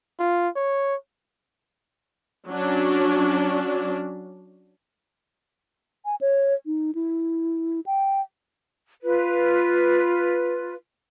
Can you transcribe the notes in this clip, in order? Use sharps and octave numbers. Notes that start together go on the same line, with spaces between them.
F4
C#5
F#3 C#4 D4
G#5
C#5
D#4
E4
G5
F4 B4